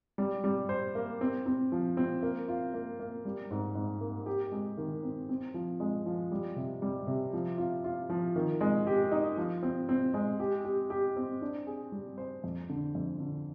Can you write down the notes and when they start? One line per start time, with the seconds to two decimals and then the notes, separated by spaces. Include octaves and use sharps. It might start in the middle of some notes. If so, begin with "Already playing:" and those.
0.18 G3
0.44 G3
0.69 C5
0.95 A#3
1.21 C4
1.46 C4
1.72 F3
1.97 C4
2.23 A#3
2.48 F4
2.74 A#3
3.00 A#3
3.25 G3
3.51 G#2
3.75 G#2
4.01 A#3
4.26 G4
4.52 G#3
4.77 D#3
5.03 C4
5.29 C4
5.54 F3
5.80 G#3
6.06 F3
6.32 G3
6.56 C3
6.82 G3
7.07 C3
7.33 F3
7.58 F4
7.84 F4
8.10 F3
8.36 D#3
8.61 G#3
8.87 G4
9.11 D#4
9.37 F3
9.63 C4
9.89 C4
10.14 G#3
10.39 G4
10.64 G4
10.90 G4
11.16 C4
11.41 D4
11.67 G#4
11.92 G3
12.18 C5
12.44 F2
12.70 D3
12.95 F2
13.20 D3